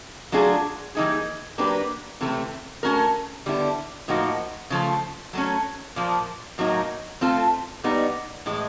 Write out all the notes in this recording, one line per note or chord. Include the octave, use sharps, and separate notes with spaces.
F#3 A3 D4 F4 G#4
E3 G3 A#3 D#4 G#4
F#3 A#3 D4 G4 B4
C3 E3 A3 C#4
A3 C#4 F#4 A#4
D3 G3 B3 E4
A2 F3 A#3 D#4 F#4
C#3 F3 A3
F#3 A3 C#4
A#2 F3 A#3
A2 F#3 A#3 D#4 F#4
A3 C4 F4 A4
A#2 G3 B3 D#4
A2 E3 G#3